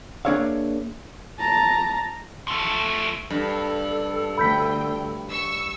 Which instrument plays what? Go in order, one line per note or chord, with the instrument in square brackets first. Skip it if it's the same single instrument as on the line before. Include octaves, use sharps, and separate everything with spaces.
[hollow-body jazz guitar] A#3 D4 G#4 C#5 E5 F5
[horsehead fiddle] A5 A#5
[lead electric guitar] F3 A3
[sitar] G2 [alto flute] A4
[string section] D2 G5 [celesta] B5 G6 B6
[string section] C#6 E6